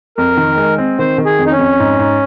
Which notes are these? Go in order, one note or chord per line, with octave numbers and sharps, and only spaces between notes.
F2 A#4
D#3
G#3
C4
D#3 C5
D#3
G#4
F2
D#4
C#4
F2
G#2
G#2